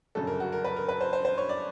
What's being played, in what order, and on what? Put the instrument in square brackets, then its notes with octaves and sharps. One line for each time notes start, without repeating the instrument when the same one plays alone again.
[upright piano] G1 F#2 C#3 A4
A#4
F#4
A#4
B4
A#4
B4
C5
C5
C5
C#5
D5